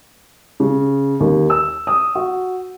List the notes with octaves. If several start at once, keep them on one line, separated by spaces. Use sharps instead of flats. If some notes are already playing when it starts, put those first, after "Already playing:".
C#3
D#2
E6
D#6
F#4